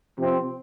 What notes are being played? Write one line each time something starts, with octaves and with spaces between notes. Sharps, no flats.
C3 F3 C4